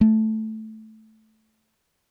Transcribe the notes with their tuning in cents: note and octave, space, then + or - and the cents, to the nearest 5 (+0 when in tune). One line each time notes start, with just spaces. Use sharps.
A3 -5